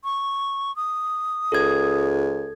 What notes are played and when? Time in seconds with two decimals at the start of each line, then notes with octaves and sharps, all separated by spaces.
0.04 C#6
0.76 D#6
1.52 C#2 A4 G#6